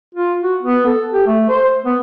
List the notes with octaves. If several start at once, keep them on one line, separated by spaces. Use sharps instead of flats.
F4
F#4
B3
A4
G4
A3
C5
B3